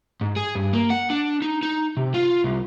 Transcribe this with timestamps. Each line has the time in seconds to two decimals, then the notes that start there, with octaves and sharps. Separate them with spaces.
0.21 G#2
0.36 G#4
0.55 G2
0.73 A#3
0.90 F#5
1.10 D4
1.42 D#4
1.63 D#4
1.97 C3
2.14 F4
2.44 C2